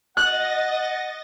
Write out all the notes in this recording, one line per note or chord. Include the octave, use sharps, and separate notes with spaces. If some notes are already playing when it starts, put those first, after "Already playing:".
D#5 F#5 F#6 A6 A#6